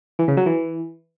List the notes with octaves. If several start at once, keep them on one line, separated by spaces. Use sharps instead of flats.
E3
C#3
F#3
E3